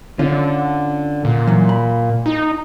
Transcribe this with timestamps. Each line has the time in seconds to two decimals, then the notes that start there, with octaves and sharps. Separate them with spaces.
0.19 D3 C#4 F4
1.25 A#2
1.47 E3 F#3
1.69 B5
2.26 D#4